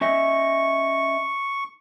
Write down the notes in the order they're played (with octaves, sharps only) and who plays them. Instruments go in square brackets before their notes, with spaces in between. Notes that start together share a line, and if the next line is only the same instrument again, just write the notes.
[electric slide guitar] C#4 D#5 E5 [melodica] C#6